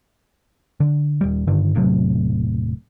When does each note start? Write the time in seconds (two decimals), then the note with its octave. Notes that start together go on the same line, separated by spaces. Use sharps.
0.80 D3
1.21 D#1 G3
1.47 G2 D3 D#3
1.75 E1 A2 C3 F#3